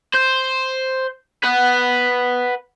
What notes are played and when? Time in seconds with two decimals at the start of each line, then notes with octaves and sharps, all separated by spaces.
0.14 C5
1.43 B4 F#5